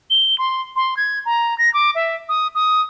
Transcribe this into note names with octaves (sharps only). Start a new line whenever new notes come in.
G7
C6
C6
G#6
A#5
A#6
D6
E5
D#6
D#6